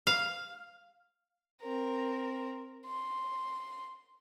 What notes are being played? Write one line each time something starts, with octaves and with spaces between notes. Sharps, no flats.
F5
C4 A#4
C6